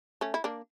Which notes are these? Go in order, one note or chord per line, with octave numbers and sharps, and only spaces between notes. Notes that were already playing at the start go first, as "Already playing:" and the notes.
A3 C#4
E4
A#3 D4